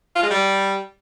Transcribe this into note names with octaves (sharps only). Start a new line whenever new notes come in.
F4
G#3
G3